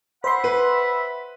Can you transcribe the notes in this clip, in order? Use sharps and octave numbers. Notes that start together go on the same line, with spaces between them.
C5 E5 F#5 B5 C6
B4